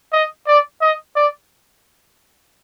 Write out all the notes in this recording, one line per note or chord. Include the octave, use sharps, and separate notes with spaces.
D#5
D5
D#5
D5